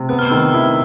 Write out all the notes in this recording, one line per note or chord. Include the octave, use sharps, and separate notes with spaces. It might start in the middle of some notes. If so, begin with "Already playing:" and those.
Already playing: C3
B3 F#6
F6
D#3 E6
F6
E4
E6